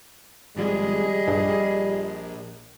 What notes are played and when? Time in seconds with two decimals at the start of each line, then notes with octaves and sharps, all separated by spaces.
0.56 G#1 F3 G3 G#3 G#4 D#5
1.28 A#1 G2